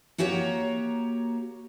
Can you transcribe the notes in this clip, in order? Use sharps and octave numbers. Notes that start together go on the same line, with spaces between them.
A#3 F#4 G4 C#5 G#5 A#5